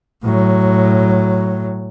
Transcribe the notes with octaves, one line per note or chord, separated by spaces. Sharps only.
A2 F#3